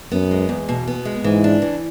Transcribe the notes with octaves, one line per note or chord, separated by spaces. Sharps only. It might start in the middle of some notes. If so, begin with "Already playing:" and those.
F#2 B3
G#3
E2
B2
B3
G#3
G#2 E3
D4
E3